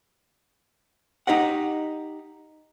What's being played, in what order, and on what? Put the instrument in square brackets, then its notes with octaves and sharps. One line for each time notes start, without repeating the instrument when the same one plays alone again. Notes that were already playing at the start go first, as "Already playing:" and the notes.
[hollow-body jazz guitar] D#4 G4 D#5 F#5